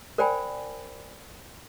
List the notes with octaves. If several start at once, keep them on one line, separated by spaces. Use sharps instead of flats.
A#4 C5 D5 G5 G#5 B5